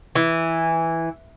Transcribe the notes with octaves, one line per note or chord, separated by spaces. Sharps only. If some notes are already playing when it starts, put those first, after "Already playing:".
E3